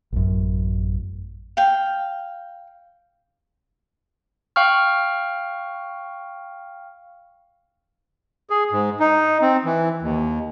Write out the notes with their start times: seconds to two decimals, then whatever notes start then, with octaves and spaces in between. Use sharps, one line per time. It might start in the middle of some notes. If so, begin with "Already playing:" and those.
0.12 A1 F#2
1.57 F5 G5
4.56 F5 G5 C#6 F6
8.50 G#4
8.72 G#2
9.00 D#4
9.42 C4
9.65 E3
10.02 D#2